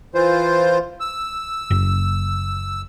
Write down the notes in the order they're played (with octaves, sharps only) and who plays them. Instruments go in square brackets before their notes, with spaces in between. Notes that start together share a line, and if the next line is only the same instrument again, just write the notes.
[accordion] E3 F4 C5
E6
[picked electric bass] F#1